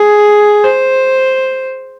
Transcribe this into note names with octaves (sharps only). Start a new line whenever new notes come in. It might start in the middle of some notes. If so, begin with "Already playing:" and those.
Already playing: G#4
C5